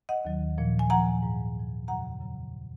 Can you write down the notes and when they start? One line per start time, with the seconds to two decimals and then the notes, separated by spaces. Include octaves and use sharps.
0.09 D#5 F#5
0.25 D#2 D#3 F#3
0.58 A#2 F3
0.79 G#5
0.90 A#2 F3 F#5 A#5
1.22 G#2 F3
1.55 G#2 F3
1.88 F2 C#3 F#3 F#5 A#5
2.20 C#3 F#3